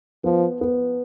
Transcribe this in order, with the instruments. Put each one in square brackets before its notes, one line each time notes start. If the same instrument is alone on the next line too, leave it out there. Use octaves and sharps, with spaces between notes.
[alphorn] F3 [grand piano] B3
[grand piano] B3